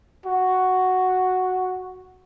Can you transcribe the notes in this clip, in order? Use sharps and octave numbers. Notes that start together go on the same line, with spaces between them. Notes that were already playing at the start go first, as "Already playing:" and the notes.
F#4